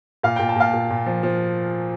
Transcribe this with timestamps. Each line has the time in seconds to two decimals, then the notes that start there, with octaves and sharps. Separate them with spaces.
0.23 A#2 F5
0.36 A#2 G5
0.49 A5
0.56 A#2 F5
0.73 A#2
0.90 A#2
1.06 F3
1.23 F3